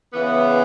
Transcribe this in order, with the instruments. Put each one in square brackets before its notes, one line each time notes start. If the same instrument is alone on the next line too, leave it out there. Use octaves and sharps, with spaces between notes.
[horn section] C#3 E3 B3